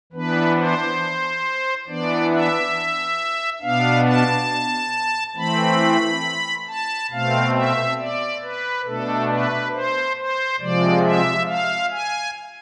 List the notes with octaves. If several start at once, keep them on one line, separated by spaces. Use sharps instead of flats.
E3 B3 D4 B4
C5
E3 B3 D4 D5
E5
B2 B3 D4 F5
A5
E3 A3 C4 B5
A5
B2 A3 C4 F5
E5
D5
B4
B2 A3 D4 A4
B4
C5
C5
C3 F3 G#3 D5
E5
F5
G#5